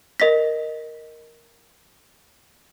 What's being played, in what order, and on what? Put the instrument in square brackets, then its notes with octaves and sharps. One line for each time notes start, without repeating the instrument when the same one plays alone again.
[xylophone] A#4 D#5 A#6 B6